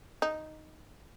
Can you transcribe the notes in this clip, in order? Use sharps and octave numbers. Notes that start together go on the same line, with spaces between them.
D#4